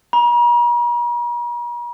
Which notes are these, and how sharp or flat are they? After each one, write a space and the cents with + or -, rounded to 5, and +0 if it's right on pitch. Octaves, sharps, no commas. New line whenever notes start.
A#5 +45